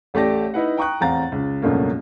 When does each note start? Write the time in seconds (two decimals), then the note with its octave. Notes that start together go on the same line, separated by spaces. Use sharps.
0.14 A1 A3 G4 D5 A5 A#6
0.54 D#4 E4 B4 F#5
0.77 G5 A#5 C#6 D#6 F#6
1.01 E2 A2 C4 F5 A#5 A6
1.32 C#2
1.62 C#2 G2 B2 F#3 A3 A#3